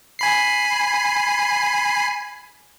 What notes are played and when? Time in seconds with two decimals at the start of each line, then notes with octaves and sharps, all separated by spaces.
0.19 G#5 B5 C7